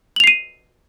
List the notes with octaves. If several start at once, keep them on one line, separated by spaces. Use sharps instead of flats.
C7 D#7 F7 F#7